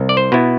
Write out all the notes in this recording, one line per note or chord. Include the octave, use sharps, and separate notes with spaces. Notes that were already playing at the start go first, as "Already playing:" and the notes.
Already playing: C2
D5
C5
B2 B3 E4